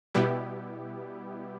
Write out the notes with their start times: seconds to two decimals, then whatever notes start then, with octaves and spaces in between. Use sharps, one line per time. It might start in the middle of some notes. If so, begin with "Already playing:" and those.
0.14 B2 G3 B3 E4 G4